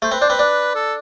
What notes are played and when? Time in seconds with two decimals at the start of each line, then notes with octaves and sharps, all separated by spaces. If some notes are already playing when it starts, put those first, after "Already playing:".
0.02 A3 C5
0.11 C4 B4
0.21 D4 C5
0.30 C4 B4
0.39 D4
0.75 A4